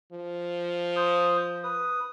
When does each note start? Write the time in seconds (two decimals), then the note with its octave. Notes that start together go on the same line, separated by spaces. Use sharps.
0.12 F3
0.96 C5 D#6
1.63 B4 D#6